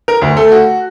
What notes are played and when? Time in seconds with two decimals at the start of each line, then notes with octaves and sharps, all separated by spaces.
0.08 A#4
0.22 D2
0.37 A3
0.52 F#4